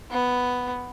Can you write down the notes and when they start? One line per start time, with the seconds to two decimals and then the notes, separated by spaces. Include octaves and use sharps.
0.11 B3